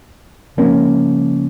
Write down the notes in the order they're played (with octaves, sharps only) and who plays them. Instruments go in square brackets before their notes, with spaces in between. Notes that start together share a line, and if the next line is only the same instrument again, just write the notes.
[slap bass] C#3 F3 G#3 [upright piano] A#3 C#4